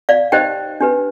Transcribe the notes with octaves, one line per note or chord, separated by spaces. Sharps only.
D5 F5
D#4 G4 C5 D#5 G5
D4 G4 B4